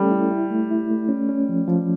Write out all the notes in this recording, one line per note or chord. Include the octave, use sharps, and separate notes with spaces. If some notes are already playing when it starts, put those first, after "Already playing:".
Already playing: G3 A3 C#4 A4
E4
E4
A3
E4
A3
C#4
C#4
F3
F3